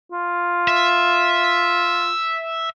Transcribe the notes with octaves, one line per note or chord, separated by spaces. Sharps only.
F4
E5